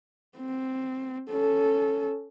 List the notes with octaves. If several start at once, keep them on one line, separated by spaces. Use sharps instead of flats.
C4
C#4 A4